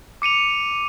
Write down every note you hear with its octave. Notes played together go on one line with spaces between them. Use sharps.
D6 C#7 D#7 F7